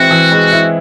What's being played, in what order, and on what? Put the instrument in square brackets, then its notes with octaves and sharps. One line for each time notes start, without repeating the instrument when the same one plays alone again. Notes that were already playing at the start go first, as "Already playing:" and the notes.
Already playing: [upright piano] E3 G#3 C4 E4 [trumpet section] F#4
[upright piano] E3
G#3
E4